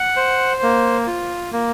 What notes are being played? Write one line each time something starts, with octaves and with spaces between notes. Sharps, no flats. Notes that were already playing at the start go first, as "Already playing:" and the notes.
Already playing: F#5
C5
A#3
F4
A#3